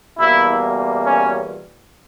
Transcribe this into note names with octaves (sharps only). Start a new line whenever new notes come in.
E2 B2 G3 A#3 E4
C#4